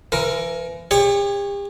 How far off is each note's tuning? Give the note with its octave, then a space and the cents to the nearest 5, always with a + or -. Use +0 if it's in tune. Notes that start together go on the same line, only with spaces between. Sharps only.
E3 +35 A#4 +5
G4 +40 C#5 +0